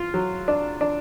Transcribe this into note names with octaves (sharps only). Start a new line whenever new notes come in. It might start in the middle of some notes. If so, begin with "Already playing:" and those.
Already playing: F4
F#3
D4
D4